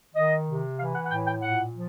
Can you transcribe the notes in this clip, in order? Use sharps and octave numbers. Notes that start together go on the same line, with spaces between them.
D#3 D#5
C3
E3 F5
F#5
F#5
A2 G5
G5
A#2 F#5
F3